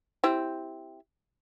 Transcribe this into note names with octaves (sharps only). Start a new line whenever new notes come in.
C4 E4 G4